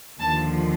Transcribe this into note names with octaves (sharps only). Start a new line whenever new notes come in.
D#2 D3 F3 A5